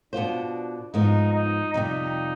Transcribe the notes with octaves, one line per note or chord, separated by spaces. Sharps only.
B2 B3 D4 F4 C5
G#2 F3 B3 D#4
D#4
F2 C3 G3 D#4